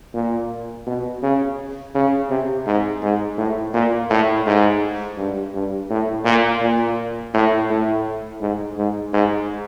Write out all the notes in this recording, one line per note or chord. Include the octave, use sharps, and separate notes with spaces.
A#2
B2
C#3
C#3
C3
G#2
G#2
A2
A#2
A2
G#2
G2
G2
A2
A#2
A#2
A2
A2
G#2
G#2
G#2